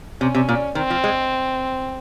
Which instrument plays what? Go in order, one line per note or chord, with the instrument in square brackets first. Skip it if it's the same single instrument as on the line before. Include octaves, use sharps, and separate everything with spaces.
[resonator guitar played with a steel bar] C3 [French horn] C#4
[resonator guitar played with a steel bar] C3
A#2
[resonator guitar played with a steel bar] D#3 [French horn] C4
[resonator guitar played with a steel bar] F3
G#3